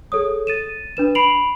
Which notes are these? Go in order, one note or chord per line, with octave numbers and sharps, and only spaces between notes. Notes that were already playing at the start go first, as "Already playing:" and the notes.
G#4 A4 C#5 D#6
A6 D#7 E7
D4 B4 E7
B5 C7 D7 F7 F#7